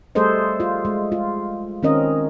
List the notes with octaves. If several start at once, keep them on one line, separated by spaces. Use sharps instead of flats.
G3 A3 G#4 A4 C5 D#5
F4
G#3
F4
D#3 C4 C#4 A#4 D#5